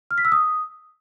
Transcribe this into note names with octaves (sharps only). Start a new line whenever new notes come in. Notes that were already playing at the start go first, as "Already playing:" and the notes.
F6
B6
E6
D#6